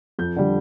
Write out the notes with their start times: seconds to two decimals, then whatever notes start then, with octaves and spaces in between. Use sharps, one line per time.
0.19 F2 G6
0.36 D3 G3